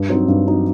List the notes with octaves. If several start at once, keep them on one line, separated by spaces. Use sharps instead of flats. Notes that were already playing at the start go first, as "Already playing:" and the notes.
Already playing: G2
F#3 C4 D#4
G2
F#3 C4 D#4